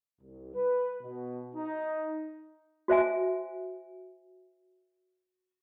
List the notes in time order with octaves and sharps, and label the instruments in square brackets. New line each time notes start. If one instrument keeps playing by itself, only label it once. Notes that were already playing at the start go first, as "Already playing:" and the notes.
[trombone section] C2
B4
B2
D#4
[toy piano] F#4 C5 E5 G#5